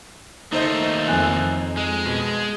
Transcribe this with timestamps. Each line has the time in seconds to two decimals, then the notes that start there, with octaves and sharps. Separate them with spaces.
0.53 D#2 A3 D#4 C5 D#5
1.08 F2 G#5 F#6
1.77 G#3
2.05 B2